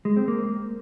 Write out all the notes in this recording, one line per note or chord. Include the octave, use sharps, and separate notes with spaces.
G#3
C4
A#3